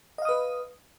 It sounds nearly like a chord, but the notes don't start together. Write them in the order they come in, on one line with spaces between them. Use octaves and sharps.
D#5 F5 D#6 B4